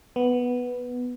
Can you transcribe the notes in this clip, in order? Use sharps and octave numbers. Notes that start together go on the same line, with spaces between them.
B3